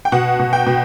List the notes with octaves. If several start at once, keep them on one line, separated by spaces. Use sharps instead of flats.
G5
B2 F#5
B2
G5
B2